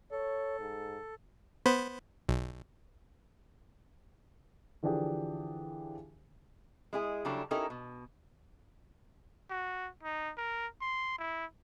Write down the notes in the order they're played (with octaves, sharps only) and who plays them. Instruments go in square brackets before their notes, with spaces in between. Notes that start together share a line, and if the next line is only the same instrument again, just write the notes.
[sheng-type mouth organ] A4 [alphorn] C#5
[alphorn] G#2
[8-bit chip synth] B3 C5 B5
B1
[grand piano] D3 E3 F3 D4 G4 G#4
[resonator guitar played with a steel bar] G#3 E4 G#4
C#3 F#3 G3 D4 E4 A4
C#4 D#4 E4 G4 A4 A#4
B2
[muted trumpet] F#4
D#4
A#4
C6
E4